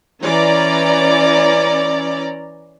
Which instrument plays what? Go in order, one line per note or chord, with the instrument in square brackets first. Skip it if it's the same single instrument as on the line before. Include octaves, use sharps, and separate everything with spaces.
[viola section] E3 C#4 D5 A#5